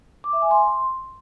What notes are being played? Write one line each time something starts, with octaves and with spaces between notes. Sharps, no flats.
D6
E5
G#5
C6